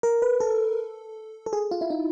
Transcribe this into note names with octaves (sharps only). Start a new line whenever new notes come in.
A#4
B4
A4
A4
G#4
F4
E4
D#4